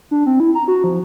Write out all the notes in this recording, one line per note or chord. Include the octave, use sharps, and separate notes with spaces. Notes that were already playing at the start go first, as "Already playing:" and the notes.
D4
C4
E4
A#5
F#4
F3